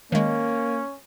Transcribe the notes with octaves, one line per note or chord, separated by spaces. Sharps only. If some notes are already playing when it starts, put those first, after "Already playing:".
D#3 G#3 A#3 C#4